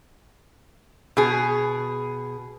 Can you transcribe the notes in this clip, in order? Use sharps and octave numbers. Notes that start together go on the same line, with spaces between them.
B2 G#4